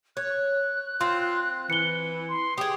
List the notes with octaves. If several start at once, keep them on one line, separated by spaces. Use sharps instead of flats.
C#5 F#6
C4 F4 C6
E3 C#7 G7
C6
G4 G#4 D#6